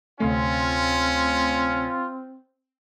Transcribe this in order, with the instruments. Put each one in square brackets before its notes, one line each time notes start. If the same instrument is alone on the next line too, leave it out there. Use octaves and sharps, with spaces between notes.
[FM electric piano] D2 C3 A3 [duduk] C4 [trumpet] C#4 [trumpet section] F4